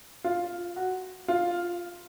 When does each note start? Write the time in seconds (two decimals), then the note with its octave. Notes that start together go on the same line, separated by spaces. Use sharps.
0.24 F4
0.76 F#4
1.28 F4